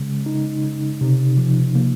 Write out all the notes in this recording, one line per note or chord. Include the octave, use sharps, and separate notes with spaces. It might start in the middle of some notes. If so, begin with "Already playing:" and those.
Already playing: C#3 G#3
D#4
C#3
C3
F3
A#3